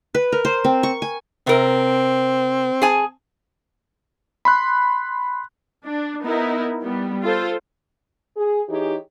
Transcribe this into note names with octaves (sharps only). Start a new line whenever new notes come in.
B4
A#4
C5
C4
C#6
G#5
C3 C4 A#4
G#4 G#5 A5
B5 C6 F#6
D4
B3 D#4 E4 A#4
G3 B3
F4 A4 C5
G#4
E3 D#4 G4 G#4 C#5